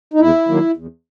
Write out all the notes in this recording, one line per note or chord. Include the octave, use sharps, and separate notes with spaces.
D#4
E2 E4
D#3 F#3 A#3
E2